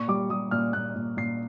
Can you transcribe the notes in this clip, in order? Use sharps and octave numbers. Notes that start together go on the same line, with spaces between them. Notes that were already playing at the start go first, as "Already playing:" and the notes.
Already playing: A#2 C#6
G3 D6
G3 D#6
A#2 F6
A#2 F#6
A#2
A#2 C7